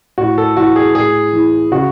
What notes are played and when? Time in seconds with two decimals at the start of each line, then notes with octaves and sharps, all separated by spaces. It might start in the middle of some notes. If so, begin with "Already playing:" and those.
0.18 A2 F#4
0.38 A4
0.57 E3 F#4
0.76 G#4
0.95 A2 G#4
1.32 E3
1.72 C#3 F#4